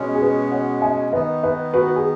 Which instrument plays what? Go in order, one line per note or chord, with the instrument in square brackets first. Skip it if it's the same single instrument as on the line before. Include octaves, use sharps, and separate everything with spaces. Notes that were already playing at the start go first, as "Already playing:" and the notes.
Already playing: [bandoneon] B2 G#3 C#4
[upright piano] G#4
F#4 B4
C#5 F#5
D#5 G#5
[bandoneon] D#3 B3 D#4 [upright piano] B4 D#5
[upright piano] B4 D#5
F#4 B4
G#4